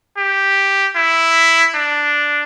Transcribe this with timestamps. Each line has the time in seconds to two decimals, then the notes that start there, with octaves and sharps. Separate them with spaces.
0.18 G4
0.96 E4
1.75 D4